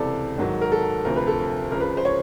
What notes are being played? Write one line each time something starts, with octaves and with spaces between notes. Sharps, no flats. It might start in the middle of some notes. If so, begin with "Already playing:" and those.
Already playing: C#2 C3 E3 A4 D5
G#2 D#3 F#3
A#4
A4
D2 C3 F3 A#4
B4
A4
C#2 C#3 F3 A#4
B4
C5
C#5